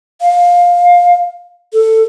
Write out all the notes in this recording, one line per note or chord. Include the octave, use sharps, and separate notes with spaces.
F5
A4